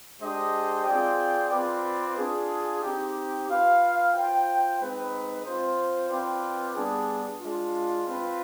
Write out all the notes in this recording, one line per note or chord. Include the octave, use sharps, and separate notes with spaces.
G#3 D4 G4 C5 D#5
C4 F4 G#4 D5 G5
C4 F4 B4 D5
D4 F4 G#4
C4 D#4 G4
F4 B4 F5
F4 C5 G5
G#3 C4 D#4 B4
C4 F4 C5
C4 F4 B4 D5 G5
G3 B3 D4 G#4
G#3 D4 F4
C4 F4 B4